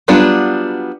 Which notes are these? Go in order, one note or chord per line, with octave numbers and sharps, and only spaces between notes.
F#3 G3 B3 D4 F4